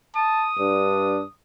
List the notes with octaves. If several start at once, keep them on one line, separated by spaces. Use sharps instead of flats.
A5 D#6
G2 D4